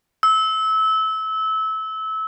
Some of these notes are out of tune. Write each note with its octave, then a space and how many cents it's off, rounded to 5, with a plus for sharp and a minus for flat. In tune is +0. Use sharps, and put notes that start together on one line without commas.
E6 -25